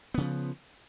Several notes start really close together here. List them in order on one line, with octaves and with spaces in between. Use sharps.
B3 C#3 F3